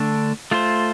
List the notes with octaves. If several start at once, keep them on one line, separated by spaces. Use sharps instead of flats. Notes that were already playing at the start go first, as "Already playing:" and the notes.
Already playing: D3 A3 D4
A3 F4 C5